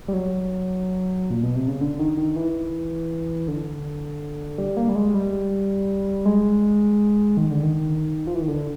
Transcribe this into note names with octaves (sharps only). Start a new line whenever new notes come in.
G3
F#3
A#2
B2
C3
C#3
D3
D#3
D#3
E3
D3
G3
A#3
G3
G#3
G3
G#3
D#3
D3
D#3
F3
E3
D#3
D3